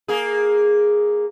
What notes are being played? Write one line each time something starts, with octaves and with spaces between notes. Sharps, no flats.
A#3 G#4